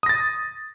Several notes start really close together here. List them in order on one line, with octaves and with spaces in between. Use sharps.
D#6 A#6 A6